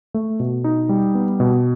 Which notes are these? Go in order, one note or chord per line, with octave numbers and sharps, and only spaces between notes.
A3
B2
D#4
G3
B3
B2